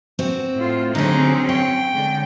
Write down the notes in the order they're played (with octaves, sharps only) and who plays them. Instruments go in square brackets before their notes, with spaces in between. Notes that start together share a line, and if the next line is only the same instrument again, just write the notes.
[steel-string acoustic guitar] C4 F#4
[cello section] A2 F4
[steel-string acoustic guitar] D3 G#4 [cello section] F#3 C4 C#4 [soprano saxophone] D#4
[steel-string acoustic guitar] C#5 [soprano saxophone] G5
[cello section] D3 G#3